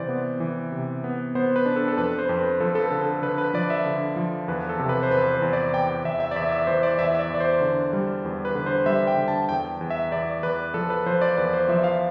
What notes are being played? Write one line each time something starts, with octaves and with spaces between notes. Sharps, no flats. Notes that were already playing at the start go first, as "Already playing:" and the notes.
Already playing: C3 E3 C5 D5
B3
E3
C3
B3
B3 C5
B4
D4
A4
A4
F2 B4
C5
F2
B4
F3 A4
A4
B4
D3
A4
D3 B4
B4
F3 D5
E5
D3
F3
E2 B4
A4
C3
B4
C5
E2 B4
C5
E2
D5
E2 G5
G5
E2 E5
E5
D5
E2 E5
E5
E3 C5
D5
E2 E5
E5
D5
E2 D5
C5
D3
G3
E2
B4
D3
C5
G3 E5
G5
D3
A5
E2 G5
E2
E5
E2 D5
E2 B4
F3 A4
B4
F3 C5
D5
E2 B4
C5
F3 E5
F5